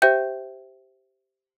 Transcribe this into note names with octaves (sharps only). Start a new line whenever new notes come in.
G4 C5 E5 G5 G6